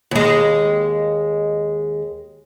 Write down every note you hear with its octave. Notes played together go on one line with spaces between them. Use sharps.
D#2 G#3